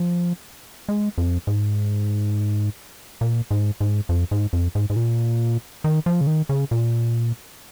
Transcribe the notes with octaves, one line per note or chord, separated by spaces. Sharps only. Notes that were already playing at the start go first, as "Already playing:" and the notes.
Already playing: F3
G#3
F2
G#2
A#2
G#2
G#2
F2
G#2
F2
G#2
G#2
A#2
D#3
F3
C#3
D#3
C#3
A#2